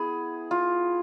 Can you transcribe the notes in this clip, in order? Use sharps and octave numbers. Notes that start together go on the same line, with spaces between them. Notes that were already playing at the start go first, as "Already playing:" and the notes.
Already playing: B3 E4 G#4
F4